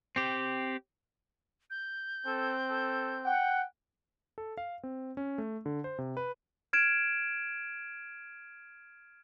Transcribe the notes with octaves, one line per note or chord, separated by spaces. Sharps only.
C4 G4
G6
C4 A4
A4
F#5 G5
A4
F5
C4
C#4
A3
D3
C5
C3
B4
F6 G#6 D7 E7